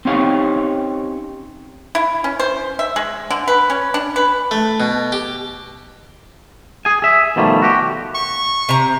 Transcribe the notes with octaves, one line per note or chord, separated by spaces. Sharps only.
C4 C#4 D#4 G4 C#5 F5
E4
C#4
C5
E5
G#3
D3
B4
C#4
D4
B4
A3
B2
G4
G#4 G#5
G#4 E5
B2 D#3 F3 G3 A3
F#4 G4
C#6
C3 A#5